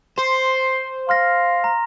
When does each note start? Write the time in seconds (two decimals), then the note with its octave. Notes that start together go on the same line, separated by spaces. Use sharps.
0.19 C5 C6
1.09 F5 C6 F6 A#6
1.64 A#5